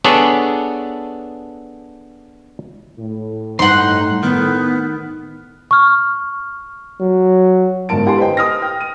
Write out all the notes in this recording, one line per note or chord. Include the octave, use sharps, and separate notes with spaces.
B3 D4 G#4 A4 C#5 D5
A2
E2 G2 D#4 F#5 C6
D#3 B3
C#6 F6
F#3
G1 G#2 G#3 A#4 A5 D7
E4 G4 F#5 G#5 A5 C6
B4 C5 D#5 G5
D#6 F6 A#6
G5
D#7